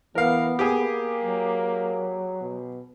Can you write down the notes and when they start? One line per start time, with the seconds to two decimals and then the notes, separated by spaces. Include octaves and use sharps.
0.15 E3 B3 A#4 F5
0.59 A#3 G4 G#4
1.21 F#3
2.42 B2